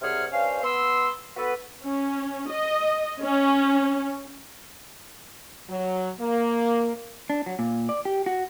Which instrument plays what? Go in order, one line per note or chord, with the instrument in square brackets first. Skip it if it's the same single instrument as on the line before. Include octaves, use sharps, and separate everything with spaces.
[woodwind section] C2 C3 G#4 C#5 F#5 F6
G2 C#4 C5 F5
B3 C6 E6
B3 F#4 A4 B4
[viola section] C#4
D#5
C#4
[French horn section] F#3
A#3
[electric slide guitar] D4
F#3
A#2
D5
G4
F#4